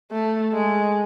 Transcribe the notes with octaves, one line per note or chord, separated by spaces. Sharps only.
A3
G#3